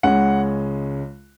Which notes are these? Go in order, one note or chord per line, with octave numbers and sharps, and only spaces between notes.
C#2 C#3 G#3 C#4 F#5